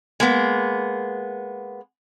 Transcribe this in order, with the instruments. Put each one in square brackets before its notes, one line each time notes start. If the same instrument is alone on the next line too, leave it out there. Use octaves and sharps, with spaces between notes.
[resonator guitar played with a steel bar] G#3 A#3 B3